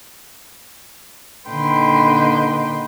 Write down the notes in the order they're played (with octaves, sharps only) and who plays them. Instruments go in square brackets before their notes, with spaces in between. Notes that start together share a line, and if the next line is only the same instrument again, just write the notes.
[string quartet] A#2 D3 D#4 B4 G5 C6